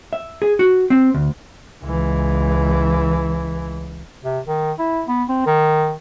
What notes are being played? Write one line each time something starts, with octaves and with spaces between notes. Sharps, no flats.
E5
G#4
F#4
C4
D2
C#2 E3
C3
D#3
E4
B3
C4
D#3